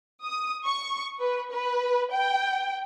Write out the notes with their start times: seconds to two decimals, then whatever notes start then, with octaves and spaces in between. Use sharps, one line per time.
0.23 D#6
0.66 C#6
1.20 B4
1.51 B4
2.12 G5